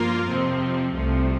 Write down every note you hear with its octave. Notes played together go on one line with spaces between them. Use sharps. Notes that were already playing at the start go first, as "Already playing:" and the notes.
Already playing: G2 F3 A#3 F4 A#4
F2 C3 F3 C4
C2 C3 F3 A3